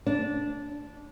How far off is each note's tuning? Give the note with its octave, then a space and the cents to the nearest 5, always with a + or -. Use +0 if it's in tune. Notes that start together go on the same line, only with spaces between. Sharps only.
D4 -15